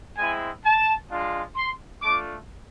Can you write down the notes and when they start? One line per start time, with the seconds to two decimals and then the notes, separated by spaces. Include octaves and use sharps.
0.17 G#3 C4 E4 G#5
0.64 A5
1.10 G#3 D4 F4
1.56 C6
2.02 A3 D4 F4 D6